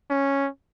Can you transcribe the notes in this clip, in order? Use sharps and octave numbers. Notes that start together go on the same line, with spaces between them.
C#4